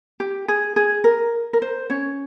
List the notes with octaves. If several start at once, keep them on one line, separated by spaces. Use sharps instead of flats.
G4
G#4
G#4
A#4
A#4
C5
C#4 C#5